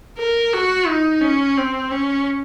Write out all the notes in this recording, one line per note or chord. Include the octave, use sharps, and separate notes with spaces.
A#4
F#4
D#4
C#4
C4
C#4